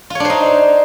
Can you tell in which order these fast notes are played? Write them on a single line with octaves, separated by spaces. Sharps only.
F4 C#5 D4 C5 D#4